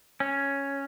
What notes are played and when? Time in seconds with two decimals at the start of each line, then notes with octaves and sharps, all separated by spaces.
0.20 C#4